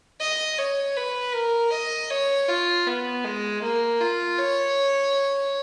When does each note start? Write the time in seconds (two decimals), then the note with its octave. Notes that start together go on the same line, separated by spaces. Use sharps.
0.21 D#5
0.58 C#5
0.97 B4
1.34 A#4
1.72 D#5
2.10 C#5
2.48 F4
2.87 B3
3.24 G#3
3.63 A#3
4.00 F4
4.38 C#5